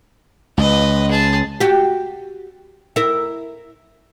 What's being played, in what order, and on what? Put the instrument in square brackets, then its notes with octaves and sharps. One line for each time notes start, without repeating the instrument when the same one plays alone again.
[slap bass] C#2 [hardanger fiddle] B4 D#5
[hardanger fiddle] G#4 A5
[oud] F#4 G4
E4 A#4